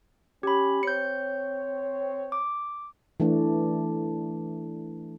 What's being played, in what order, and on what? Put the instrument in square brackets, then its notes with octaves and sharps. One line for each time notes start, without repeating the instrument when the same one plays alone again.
[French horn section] C#4 [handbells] G4 B5
[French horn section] C4 C#5 [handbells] G6 C#7
[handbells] D6
[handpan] E3 A3 D4